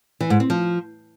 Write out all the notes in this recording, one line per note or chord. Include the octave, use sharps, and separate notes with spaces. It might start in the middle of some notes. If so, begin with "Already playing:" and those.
E3
G#2
C4
F3